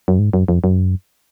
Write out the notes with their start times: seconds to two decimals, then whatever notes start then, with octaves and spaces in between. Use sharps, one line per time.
0.08 F#2
0.19 G#2
0.33 F#2
0.48 F2
0.64 F#2